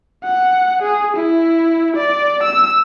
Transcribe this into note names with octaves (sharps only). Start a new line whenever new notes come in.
F#5
G#4
E4
D5
E6